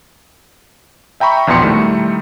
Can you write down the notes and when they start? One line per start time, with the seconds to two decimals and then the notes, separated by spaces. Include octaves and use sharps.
1.20 E5 G5 A#5 B5 C#6
1.47 A#1 E2 B2 C6 C#7
1.62 D#3 G3 A3 E4